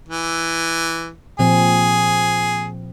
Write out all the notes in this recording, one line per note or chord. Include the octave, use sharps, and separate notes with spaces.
E3
A#2 F3 C4 G#4